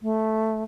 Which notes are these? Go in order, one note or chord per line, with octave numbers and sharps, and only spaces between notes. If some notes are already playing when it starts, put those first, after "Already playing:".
A3